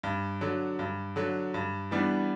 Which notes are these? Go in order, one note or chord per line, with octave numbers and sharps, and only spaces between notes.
G2
D3 F#3
G2
D3 F#3
G2
E3 G3 B3 D4